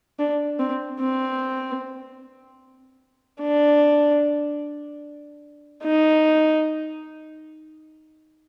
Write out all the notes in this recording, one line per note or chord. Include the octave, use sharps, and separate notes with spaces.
D4
C4
C4
D4
D#4